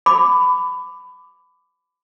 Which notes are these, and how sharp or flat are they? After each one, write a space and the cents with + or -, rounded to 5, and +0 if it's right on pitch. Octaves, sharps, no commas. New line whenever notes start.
B5 +20 D6 +0